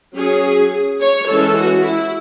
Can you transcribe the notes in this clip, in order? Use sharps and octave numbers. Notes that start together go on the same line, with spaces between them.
F#3 C#4 G#4
C#5
E3 G#3 C#4 A4
F#4
E4